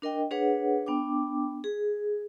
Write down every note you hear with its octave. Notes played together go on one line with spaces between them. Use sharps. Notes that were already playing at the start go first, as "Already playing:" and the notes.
D4 A#4 D#5 G5
D4 G#4 B4 C#5 F#5
B3 D4 G5 D6
G#4